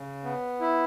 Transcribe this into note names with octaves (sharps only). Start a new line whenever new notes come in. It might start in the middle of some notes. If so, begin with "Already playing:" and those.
Already playing: C#3
B3
E4